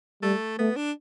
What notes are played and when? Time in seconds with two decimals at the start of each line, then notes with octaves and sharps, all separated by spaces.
0.22 G3 A3
0.59 A3 B3
0.76 D4